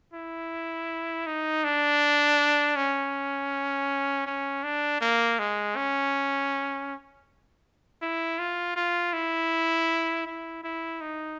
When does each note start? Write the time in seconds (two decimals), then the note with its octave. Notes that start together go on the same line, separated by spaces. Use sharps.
0.14 E4
1.26 D#4
1.64 D4
2.76 C#4
4.26 C#4
4.63 D4
5.01 A#3
5.39 G#3
5.76 C#4
8.02 E4
8.39 F4
8.76 F4
9.13 E4
10.26 E4
10.63 E4
11.01 D#4